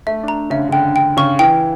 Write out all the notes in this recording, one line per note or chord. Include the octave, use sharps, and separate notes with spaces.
A3 E5
D4
A#5
C#3 E5
D3
C#3
D3 G5
D3 G5
C#3 C#6
E3 G5